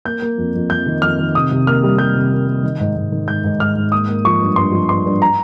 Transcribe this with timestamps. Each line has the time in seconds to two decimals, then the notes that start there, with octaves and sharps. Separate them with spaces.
0.05 A#3 G6
0.22 A#3
0.38 F2
0.55 F2
0.70 F2 G6
0.86 D#3
1.02 F2 F6
1.19 D#3
1.35 C3 D#6
1.51 C3
1.67 A#3 F6
1.83 G3
1.98 G3 G6
2.15 C3
2.31 A#3
2.47 A#3
2.63 D#3
2.80 G#2
2.96 G#2
3.12 D#3
3.28 G#2 G6
3.44 G#2
3.60 G#2 F6
3.76 G#2
3.92 A#3 D#6
4.08 A#3
4.25 F3 C#6
4.41 G2
4.56 G2 C6
4.72 F3
4.89 G2 C6
5.05 G2
5.22 A#5